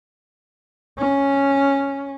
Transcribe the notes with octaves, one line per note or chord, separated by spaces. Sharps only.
C#4